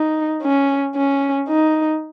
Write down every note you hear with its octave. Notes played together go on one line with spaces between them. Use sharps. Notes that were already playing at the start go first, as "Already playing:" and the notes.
Already playing: D#4
C#4
C#4
D#4